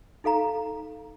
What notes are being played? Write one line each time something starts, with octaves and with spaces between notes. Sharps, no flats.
D#4 A4 F5 A#5